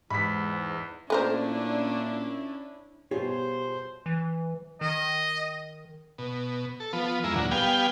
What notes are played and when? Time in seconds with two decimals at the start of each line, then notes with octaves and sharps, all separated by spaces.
0.10 E2 G#2 B5 B6
1.10 A#2 A3 C#4 D4 E4 A#4 C5
3.11 B2 G3 F4 G4 G#4 C5 C#5
4.06 E3
4.81 D#3 D#5
6.18 B2
6.80 A4
6.93 F3 B3
7.24 F2 G#3 E4 A#4
7.36 D2 A#2 F#3
7.51 G3 B3 F5 G5 G#5